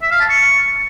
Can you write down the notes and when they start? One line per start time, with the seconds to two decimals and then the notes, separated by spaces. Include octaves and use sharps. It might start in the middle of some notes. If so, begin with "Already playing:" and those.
0.02 E5
0.11 F5
0.20 A5
0.29 C#6